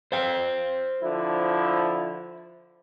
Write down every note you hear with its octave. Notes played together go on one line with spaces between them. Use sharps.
C5 F5 G5
D3 F3 E4